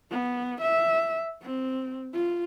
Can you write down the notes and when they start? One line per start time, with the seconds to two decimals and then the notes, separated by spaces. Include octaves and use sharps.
0.11 B3
0.61 E5
1.42 C4
2.14 F4